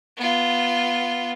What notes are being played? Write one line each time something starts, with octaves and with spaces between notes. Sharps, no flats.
B3 F4